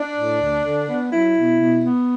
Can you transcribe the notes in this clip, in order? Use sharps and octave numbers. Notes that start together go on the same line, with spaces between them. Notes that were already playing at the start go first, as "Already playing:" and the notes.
Already playing: D4
A2
D2
D3
B3
F#3 E4
B2
B2
B3